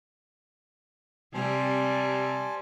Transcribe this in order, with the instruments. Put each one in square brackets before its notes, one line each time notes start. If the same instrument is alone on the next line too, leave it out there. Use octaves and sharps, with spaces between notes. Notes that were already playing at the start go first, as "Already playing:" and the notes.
[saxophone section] C3 [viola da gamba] G3 [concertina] C5 G#5 A5